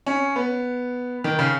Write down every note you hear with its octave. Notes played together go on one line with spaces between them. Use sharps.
C#4
B3
D#3
C#3